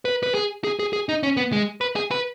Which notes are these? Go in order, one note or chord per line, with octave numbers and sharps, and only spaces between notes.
B4
B4
G#4
G#4
G#4
G#4
D#4
C#4
B3
G#3
B4
G#4
B4